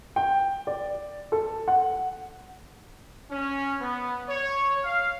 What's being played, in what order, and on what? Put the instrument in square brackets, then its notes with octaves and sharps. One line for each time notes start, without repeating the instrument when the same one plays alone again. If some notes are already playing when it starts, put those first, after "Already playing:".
[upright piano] G5
D5
A4
F#5
[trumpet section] C#4
B3
C#5
F5